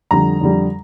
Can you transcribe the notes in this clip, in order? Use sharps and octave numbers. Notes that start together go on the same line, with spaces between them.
F2 D3 G3 A#5
F2 D3 G3